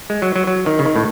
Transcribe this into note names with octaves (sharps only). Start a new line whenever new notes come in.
G#3
F#3
F#3
F#3
D#3
C#3
D#3
A2